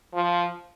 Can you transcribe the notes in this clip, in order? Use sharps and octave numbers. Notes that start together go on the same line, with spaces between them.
F3